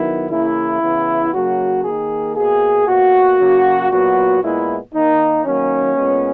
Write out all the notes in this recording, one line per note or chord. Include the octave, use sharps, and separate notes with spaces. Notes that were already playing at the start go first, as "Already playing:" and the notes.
Already playing: D#3 F#3 B3 E4
C#3 E3 A#3 E4
C#3 E3 B3
C#3 F#3 A#3 F#4
D#3 A#3 G#4
B2 A#3 G#4
B2 A#3 F#4
C#3 F#3 A#3
A#2 F#3 B3 F#4
A#2 G#3 B3 E4
D#3 A#3 D#4
D#3 F#3 A#3 C#4
A#2 G#3 B3